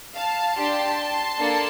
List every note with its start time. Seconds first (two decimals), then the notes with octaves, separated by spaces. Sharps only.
0.16 F5 A5
0.57 D4 G4 A5 C6
1.38 A#3 D4 A4